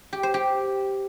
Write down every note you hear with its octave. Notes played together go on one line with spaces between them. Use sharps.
G4
C5
G4